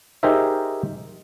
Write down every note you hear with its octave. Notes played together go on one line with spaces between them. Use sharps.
D#4 G4 G#4 A#4 C5 E5